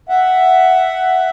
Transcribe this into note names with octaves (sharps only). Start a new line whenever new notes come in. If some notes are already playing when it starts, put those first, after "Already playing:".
E5 F#5